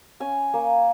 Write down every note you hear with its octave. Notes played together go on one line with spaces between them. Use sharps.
C#4 G#5
A#3